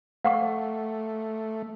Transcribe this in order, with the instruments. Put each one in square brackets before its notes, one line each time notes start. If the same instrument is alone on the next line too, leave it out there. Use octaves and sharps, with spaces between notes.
[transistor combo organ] A3 [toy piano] F5 F#5 C#6